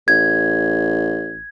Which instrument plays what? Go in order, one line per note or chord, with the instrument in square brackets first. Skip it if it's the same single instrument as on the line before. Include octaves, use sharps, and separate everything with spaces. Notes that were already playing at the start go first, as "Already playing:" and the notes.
[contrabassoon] A1 [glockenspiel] G#6